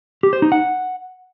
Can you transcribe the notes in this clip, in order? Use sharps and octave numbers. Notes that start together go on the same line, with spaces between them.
G4
C5
D#4
F#5